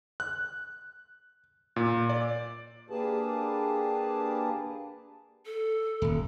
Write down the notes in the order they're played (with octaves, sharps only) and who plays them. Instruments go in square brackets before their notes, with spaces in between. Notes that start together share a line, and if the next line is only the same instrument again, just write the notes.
[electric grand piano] F#6
A#2
D5
[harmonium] A#3 D4 G4 G#4 B4 A5
[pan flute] A4
[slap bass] D#1